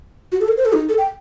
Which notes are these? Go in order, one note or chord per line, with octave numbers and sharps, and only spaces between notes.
F#4
A4
A#4
C5
A4
D#4
A4
G5